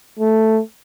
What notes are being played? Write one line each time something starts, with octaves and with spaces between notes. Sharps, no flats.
A3